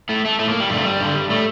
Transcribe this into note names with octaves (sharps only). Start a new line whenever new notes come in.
A2 A3
A3
A2 A3
A#3
G3
G2 D3 A3
G3
G2 D3
A2 A3